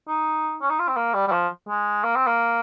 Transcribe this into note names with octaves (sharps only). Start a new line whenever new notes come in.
D#4
C#4
D#4
F4
C4
A#3
G3
G3
F3
G#3
A#3
C4
A#3